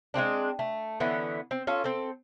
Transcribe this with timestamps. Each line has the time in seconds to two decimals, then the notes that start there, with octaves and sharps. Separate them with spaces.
0.14 G#3 A3 C4 D4
0.59 A3
1.00 D3 E3 B3 C#4
1.51 C4
1.67 C#4 F4 A4
1.84 C4 A4